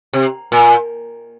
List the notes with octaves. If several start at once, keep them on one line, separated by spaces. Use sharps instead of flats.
C3
A#2